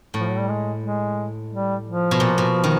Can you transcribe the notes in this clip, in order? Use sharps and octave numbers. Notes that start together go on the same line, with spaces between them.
A2
F3
F#3
G3
G#3
G#3
G3
F3
B2
A#2
B2
D#3